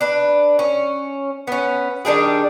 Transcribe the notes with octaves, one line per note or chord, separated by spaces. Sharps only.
D4 B4
C#4
B3 C#4
D#3 G3 D4 G#4